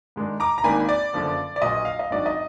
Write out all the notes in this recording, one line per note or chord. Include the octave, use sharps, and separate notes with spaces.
G#2 D#3 G#3 D4
A#5 D6
A#5
G#1 G#2 D#3 A#3 D4 G#5 B5
D5
F#1 F#2 D3 F3 B3
D5
A#1 A#2 F#3 B3 D#5
F5
D#5
G#1 G#2 F#3 D4 D5
D#5